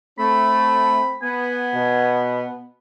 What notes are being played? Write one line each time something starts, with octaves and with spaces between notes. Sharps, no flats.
A3 C4 B5
B3 G#5
B2